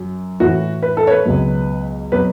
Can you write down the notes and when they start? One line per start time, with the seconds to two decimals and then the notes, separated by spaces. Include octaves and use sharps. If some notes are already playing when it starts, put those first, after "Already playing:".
Already playing: F#2 F#3
0.40 A2 E3 F#4
0.83 B4
0.97 A4
1.07 C#5
1.11 B4
1.25 C#2 B2 F#3
2.12 B2 F#3 B4